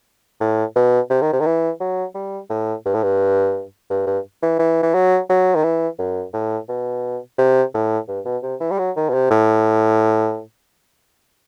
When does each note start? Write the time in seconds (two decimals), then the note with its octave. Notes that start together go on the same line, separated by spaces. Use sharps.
0.40 A2
0.76 B2
1.10 C3
1.22 D#3
1.33 C3
1.40 D#3
1.46 E3
1.80 F#3
2.15 G3
2.50 A2
2.85 G2
2.94 A2
3.03 G2
3.90 G2
4.07 G2
4.43 E3
4.59 E3
4.83 E3
4.95 F#3
5.29 F#3
5.55 D#3
5.64 E3
5.99 F#2
6.33 A2
6.69 B2
7.38 C3
7.74 A2
8.08 G2
8.25 B2
8.43 C3
8.60 E3
8.71 G3
8.79 F#3
8.96 D#3
9.09 B2
9.14 C3
9.31 A2